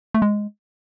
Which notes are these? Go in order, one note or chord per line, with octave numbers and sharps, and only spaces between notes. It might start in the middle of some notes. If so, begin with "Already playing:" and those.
A3
G#3